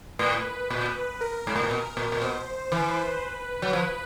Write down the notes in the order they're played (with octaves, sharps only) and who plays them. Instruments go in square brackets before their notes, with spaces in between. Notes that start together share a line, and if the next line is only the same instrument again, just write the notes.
[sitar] A2 [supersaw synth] B4
[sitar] A#2
[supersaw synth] A#4
[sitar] G#2
A2
A#2
B2
A#2
A#2
[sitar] B2 [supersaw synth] C5
[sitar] E3 [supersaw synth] B4
[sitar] F#3
[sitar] F3 [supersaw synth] B4